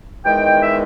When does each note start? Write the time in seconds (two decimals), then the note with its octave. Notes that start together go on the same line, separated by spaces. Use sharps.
0.24 E2 D#3 G#3 G5
0.61 E5